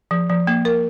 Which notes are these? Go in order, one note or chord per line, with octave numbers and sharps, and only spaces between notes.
F3
F3
A#3
A#4